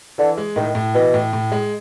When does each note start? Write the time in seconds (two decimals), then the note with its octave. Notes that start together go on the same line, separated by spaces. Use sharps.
0.18 D3 E3
0.37 G#3
0.56 A2 D#3
0.75 A2
0.94 B2 E3
1.14 A2
1.33 A2
1.52 G#3